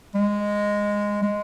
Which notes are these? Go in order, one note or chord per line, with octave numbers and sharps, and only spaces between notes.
G#3
G#3